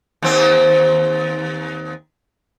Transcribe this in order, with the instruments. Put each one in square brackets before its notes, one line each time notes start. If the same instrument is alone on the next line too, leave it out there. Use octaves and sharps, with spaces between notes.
[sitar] D#2 C4